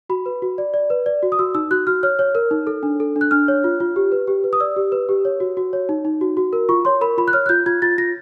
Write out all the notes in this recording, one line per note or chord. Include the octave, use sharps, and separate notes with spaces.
F#4 B5
B4
F#4
D5
D5
B4
D5
F#4
D#6
F#4 E6
D#4 E6
F#4 F#6
F#4 F6
C#5 F6
C#5
A#4
D#4
A4
D4
A4
D4
F#6
D4 F6
C#5
F4
F4
G4
B4
G4
B4
D#6
D5 E6
G4
B4
G4
C#5
F#4
F#4
C#5
D#4
D#4
F#4
F#4
A#4
F4 C#6
C#5 C6
A#4 B5
F4 B5
F#6
C#5 F6
F#6
F4 G6
F4 G#6
F4 A6
F4 A#6